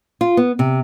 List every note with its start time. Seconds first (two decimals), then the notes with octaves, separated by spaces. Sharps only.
0.21 F4
0.37 B3
0.59 C3